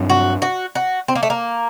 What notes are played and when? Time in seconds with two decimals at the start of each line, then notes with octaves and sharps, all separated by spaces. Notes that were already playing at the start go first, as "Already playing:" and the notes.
Already playing: G2 F#3 C4
0.10 F#4
0.42 F#4
0.75 F#4
1.08 C4
1.16 A#3
1.23 A3
1.30 A#3